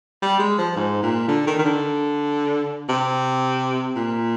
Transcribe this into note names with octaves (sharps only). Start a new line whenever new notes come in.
G3
G#3
F3
G#2
A#2
D3
D#3
D#3
D3
C3
A#2